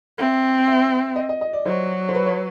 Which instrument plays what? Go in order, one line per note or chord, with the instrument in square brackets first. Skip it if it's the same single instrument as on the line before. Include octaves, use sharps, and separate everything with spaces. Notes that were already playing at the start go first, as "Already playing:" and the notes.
[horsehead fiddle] C4 [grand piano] E5
[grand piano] E5
D#5
D#5
D#5
D5
[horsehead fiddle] F#3 [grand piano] C5
[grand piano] C5
B4
C#5